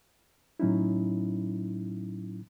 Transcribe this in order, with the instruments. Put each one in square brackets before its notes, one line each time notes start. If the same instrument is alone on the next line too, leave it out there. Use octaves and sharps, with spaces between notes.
[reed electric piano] A2 F#3 C#4 D#4 E4